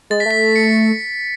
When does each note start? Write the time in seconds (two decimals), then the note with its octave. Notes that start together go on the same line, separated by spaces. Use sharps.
0.10 G#3 A6
0.20 B6
0.26 A3
0.31 B6
0.56 C#7